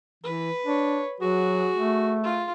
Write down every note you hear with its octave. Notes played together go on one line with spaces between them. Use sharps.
E3 B4
D4 C#5
F#3 F#4 G#4
A3
F4